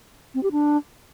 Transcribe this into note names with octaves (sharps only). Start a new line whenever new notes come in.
C4
G4
D4